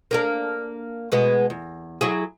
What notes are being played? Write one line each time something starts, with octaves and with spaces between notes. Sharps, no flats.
A#3 D4 A#4
B2 G#3 B3
E2
F#3 E4 G#4